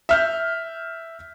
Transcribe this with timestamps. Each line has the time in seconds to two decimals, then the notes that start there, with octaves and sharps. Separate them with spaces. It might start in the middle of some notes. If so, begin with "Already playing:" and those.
0.09 E5 F6 G6